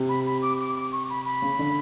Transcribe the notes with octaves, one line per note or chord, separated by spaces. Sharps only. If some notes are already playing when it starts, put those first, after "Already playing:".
Already playing: C3
B5
B5
D6
D6
D6
C#6
B5
B5
C#3
D3